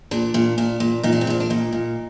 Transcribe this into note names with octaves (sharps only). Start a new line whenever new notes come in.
A#2 D4
A#2
A#2 D4
A#2
A#2 D#4
D4
C4
A#2 D4
D4
A#2 D#4
A#2